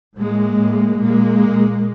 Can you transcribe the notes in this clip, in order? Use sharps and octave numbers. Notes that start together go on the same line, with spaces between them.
A2 G#3 A#3
A2
A#2 G#3 A#3
A#2